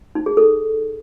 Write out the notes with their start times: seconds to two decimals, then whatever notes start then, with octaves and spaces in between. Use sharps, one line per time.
0.15 D#4
0.26 G#4
0.37 A4